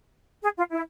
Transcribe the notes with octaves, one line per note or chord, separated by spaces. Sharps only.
G#4
F4
E4